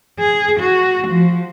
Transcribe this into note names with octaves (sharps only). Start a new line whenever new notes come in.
G#4
F#4
F3